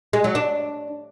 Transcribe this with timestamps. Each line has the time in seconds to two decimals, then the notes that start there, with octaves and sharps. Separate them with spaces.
0.13 G#3
0.24 F#3
0.35 D4